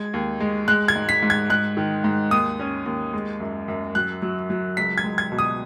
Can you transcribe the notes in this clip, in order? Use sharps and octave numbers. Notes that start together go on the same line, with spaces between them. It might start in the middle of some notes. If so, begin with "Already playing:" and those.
Already playing: G#3 G#6
D#2
G#3
G#3 F#6
G#6
G#2
B6
G#2
G#6
G#2 F#6
D#3
G#2
D#2 D#6
C#4
D#2
G#3
F#2
F#2
F#3 F#6
F#3
F#3
C#2 B6
G#6
G#3
G#6
B2
D#6